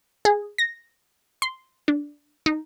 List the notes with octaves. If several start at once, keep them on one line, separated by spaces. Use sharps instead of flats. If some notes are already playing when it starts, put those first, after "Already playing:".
G#4
A#6
C6
D4
D#4